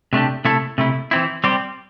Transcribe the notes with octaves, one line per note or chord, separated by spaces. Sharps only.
C3 A3 D4 G4
C3 A3 E4 A4
C3 A3 E4
E3 C4 E4
G3 C4 G4